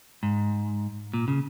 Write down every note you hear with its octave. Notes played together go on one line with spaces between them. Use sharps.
G#2
A#2
C#3